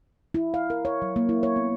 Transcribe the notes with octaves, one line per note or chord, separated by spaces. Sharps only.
E4
F5
A#4
C#5
F#3
A#3
E4
C#5
B3